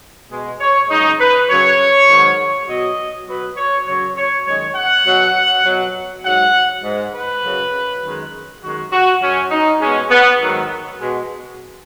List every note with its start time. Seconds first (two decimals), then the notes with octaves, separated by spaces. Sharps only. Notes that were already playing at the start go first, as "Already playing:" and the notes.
0.31 B2 G#3
0.60 C#5
0.90 F#2 C#3 G#3 D#4
1.20 B4
1.49 F#2 C#3 F#3 C#5
2.09 G#2 D#3 F#3
2.68 B2 F#3 D#5
3.27 B2 F#3 B4
3.57 C#5
3.87 F#2 C#3 F#3 C#5
4.17 C#5
4.46 F#2 D#3 G#3 C#5
4.76 F#5
5.06 B2 F#3
5.65 B2 F#3
6.25 G#2 F#3 F#5
6.84 G#2 G#3
7.14 B4
7.43 F#2 C#3 F#3
8.03 F#2 D#3 G#3
8.62 F#2 D#3 G#3 F#4
8.92 F#4
9.22 F#2 F#3 C#4
9.51 D#4
9.81 B2 G#3 C#4
10.10 B3
10.41 G#2 D#3 F#3
11.00 B2 G#3